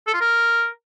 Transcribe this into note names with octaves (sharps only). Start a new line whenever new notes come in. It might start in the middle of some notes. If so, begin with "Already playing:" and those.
A4
F4
A#4